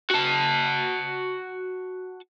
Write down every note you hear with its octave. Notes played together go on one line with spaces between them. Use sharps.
F#4 A5